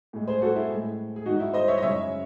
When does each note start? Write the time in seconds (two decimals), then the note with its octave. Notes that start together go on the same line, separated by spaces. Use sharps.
0.13 A2 G#3
0.28 G#4 C5
0.42 F#4 A4
0.56 E4 G#4
0.69 A2 G#3
1.16 G#4
1.26 G#2 D#3 F#3 D#4 F#4
1.40 E4
1.53 C5 D#5
1.68 C#5 E5
1.78 D#5
1.82 F#2 C#3 G#3 C#5 E5